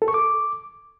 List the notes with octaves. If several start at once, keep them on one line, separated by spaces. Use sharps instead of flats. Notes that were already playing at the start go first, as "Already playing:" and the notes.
A4
C#6
D6